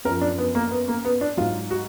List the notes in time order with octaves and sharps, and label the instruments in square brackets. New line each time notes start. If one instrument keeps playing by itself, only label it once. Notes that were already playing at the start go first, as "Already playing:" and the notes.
[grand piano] F#2 A#4
F3
D4
B3
A#3
B3
A#3
B3
D4
G#2 F#3 F4
F#4